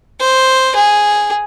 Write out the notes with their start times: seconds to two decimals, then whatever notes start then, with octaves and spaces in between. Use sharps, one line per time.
0.20 C5
0.75 G#4